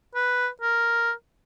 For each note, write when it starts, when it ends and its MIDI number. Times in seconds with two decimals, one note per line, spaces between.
0.15 0.48 71
0.61 1.12 70